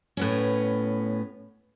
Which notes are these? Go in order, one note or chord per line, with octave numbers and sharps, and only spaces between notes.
A2 B3 C#4